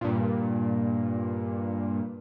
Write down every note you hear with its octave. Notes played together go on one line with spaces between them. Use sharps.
G2 A#2